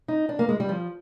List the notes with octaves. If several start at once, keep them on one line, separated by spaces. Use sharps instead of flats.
D#4
D4
A#3
G#3
G3
F3